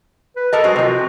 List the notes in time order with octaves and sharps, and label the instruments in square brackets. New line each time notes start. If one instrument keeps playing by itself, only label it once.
[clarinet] B4
[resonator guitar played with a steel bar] A4 A#4 D#5 [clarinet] A5
[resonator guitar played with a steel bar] F#3 G#3 C5 [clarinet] F#4
[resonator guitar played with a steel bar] C3 F3